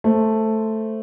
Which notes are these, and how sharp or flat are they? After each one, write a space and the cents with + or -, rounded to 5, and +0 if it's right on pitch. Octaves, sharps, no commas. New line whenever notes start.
A3 +0 C5 +0